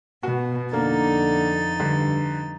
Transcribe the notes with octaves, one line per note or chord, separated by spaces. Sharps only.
B2 F#4
F2 D3 A#3 D#4 A6
G2 D3